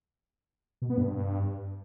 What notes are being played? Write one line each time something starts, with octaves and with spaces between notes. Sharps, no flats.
B2
B3
G2